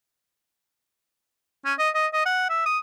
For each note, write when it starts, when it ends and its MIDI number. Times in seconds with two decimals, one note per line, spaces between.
1.65 1.73 61
1.79 1.89 75
1.95 2.07 75
2.13 2.24 75
2.26 2.45 78
2.50 2.65 76
2.66 2.78 87